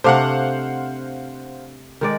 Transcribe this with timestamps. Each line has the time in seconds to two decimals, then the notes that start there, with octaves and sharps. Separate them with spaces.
0.04 C3 A3 D4 C5 F5 F#5
2.01 D#3 G#3 D5